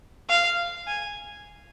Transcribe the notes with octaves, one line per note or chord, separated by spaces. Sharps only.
F5
G#5